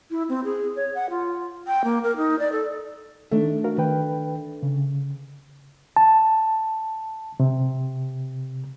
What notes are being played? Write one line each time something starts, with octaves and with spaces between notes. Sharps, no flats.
E4
C4
G#4
C#5
F#5
F4
G5
A#3
A#4
D#4
D5
A4
D#3 A3 D4 D#4
F#4 A#4 F5
D#3 B4 G5
C#3
A5
C3